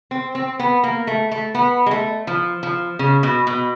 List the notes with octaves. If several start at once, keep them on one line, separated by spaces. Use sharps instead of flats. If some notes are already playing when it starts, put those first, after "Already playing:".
C4
C4
B3
A#3
A3
A3
B3
G#3
A3
F3
F3
C#3
B2
B2